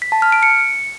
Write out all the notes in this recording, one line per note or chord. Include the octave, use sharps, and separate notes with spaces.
B6
A5
F6
D7
C#7